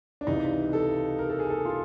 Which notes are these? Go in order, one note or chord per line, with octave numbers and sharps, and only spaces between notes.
D4
C#2 C3 E3 D#4
A4
A#4
A4
G#4
A4
F4